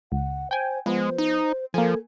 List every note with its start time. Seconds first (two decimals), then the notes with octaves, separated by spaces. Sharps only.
0.12 C#2 F#5
0.51 C5 G5 G#5
0.86 F3 G#3 B3 C5
1.18 D#4
1.74 F3 A#3 A4 G#5